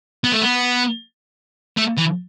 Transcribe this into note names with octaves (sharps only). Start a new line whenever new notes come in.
B3
A3
B3
A3
E3